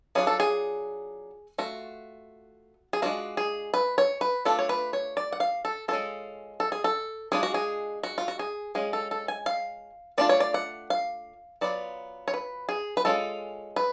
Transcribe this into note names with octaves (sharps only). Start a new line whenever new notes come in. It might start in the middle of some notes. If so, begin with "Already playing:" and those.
F#3 B3 D4 F4 G#4
A4
G#4
A3 F4 F#4
G#4
G#3 D4 F4 F#4
G#4
B4
C#5
B4
A3 D4 F4 A4
C#5
B4
C#5
D5
F#5
F5
A4
G#3 C#4 F4 A4
A4
G#4
A4
G#3 D4 F4 G#4
F#4
G#4
F#4
F4
F#4
G#4
G#3 C#4 F4 G#4
A4
A4
G#5
F5
A3 D4 F4 D5
C#5
D5
F#5
F5
F#3 B3 F4 D5
C#5
B4
G#4
B4
G#3 C#4 F4 A4
B4